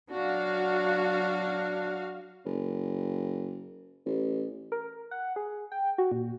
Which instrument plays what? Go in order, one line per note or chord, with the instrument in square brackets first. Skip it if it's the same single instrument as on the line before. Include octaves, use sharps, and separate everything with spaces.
[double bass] F#3 D4 [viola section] F#4 F5
[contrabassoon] F#1
A1
[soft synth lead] A#4
F#5
G#4
G5
F#4
A#2